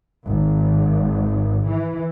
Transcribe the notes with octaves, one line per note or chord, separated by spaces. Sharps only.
G#1
E3